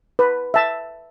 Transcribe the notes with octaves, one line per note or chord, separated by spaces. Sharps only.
B4
E5 A5